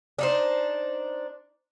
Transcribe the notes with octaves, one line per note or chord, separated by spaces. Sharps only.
D4 D#4 C5